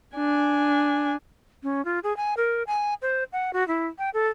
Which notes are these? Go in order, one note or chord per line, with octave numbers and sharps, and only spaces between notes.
D4 G#5
C#4
F4
G#4
G#5
A#4
G#5
C5
F#5
F#4
E4
G5
A4